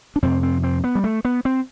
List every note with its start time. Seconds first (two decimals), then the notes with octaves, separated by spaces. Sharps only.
0.16 D4
0.22 F2 C3 C4
0.43 C4
0.63 C4
0.84 B3
0.95 G3
1.04 A3
1.25 B3
1.45 C4